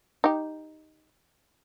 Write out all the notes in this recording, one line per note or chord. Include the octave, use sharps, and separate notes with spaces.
D#4 G4